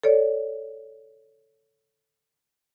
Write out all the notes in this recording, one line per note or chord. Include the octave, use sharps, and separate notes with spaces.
A4 C#5 D5